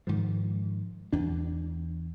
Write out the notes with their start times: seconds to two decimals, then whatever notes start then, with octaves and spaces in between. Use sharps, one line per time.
0.07 G#2 D#3 F3
1.13 E2 D4